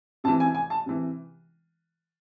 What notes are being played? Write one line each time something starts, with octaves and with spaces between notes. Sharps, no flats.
C3 E3 A5
G#5
G#5
A5
C3 E3